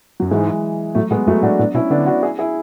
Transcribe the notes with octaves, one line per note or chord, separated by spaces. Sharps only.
F#2 F#3
G#2 E3 G#3
A2 F#3 A3
A2 G#3 B3
F#2 F#3 A3
A2 D4 F#4
A2 B3 D4
B2 C#4 E4
D3 B3 D4
D4 F#4
E4 G#4
E4 G#4